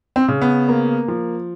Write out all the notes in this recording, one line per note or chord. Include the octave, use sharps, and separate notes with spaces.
C4
C#3
B3
A#3
F3